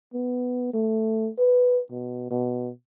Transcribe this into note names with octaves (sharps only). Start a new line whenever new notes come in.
B3
A3
B4
B2
B2